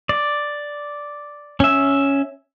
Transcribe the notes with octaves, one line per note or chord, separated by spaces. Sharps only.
D5
C#4 E5